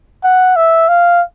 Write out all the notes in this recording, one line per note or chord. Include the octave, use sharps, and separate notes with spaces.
F#5
E5
F5